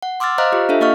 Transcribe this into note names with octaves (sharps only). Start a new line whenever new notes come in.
F#5
C6 D6 E6 F6 A6
C5 D#5 F5 A#5 F6 F#6
F4 G4
D4 F4 A4 E5
A#3 D#5 F5 C#6 F6